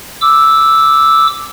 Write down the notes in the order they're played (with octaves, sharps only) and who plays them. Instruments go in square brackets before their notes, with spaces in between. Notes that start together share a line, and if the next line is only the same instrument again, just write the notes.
[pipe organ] D6 E6